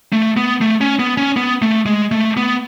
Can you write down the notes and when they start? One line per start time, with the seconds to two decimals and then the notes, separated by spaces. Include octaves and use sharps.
0.12 A3
0.37 B3
0.61 A3
0.81 C#4
0.99 B3
1.17 C#4
1.37 B3
1.62 A3
1.86 G#3
2.12 A3
2.37 B3